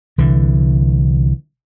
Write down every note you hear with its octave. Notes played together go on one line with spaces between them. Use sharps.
C2 D3 E3